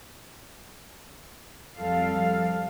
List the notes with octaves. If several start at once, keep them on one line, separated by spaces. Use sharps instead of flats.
F2 F3 G3 A4 F5